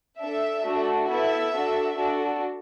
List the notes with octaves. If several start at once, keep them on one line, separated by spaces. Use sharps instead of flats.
D4 A4 E5
A3 D4 F#4 A4
B3 E4 A4 E5
D4 F#4 A4
D4 F#4 A4